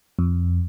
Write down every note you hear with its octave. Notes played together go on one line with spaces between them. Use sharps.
F2